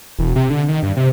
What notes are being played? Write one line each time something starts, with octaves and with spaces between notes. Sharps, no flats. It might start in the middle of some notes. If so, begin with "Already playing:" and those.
E1
C3
D3
D#3
G2
C3